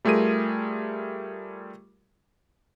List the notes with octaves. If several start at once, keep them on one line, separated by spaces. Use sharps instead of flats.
G3 A3 F4 G#4 A#4 D#7